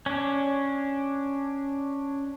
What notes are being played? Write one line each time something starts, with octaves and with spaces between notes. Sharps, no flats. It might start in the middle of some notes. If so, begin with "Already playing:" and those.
C#4 D4